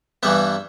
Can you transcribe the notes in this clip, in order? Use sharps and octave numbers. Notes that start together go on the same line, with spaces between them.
G2 E3 G3 B3 E5